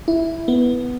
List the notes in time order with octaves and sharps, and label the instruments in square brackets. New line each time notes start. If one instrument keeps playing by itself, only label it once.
[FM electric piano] E4
B3